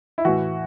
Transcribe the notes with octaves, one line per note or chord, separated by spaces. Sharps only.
E4
A2 E3 F#4